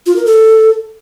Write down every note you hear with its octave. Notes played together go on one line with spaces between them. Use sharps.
F4
A#4
A4